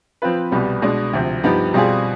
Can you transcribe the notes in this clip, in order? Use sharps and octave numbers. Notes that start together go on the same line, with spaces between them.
F3 C4 F4 B4
C2 B2 G3 B3
B2 G#3 D4
D2 C3 F3
G2 F3 B3 D#4 G4
B2 G3 C4 F4 G#4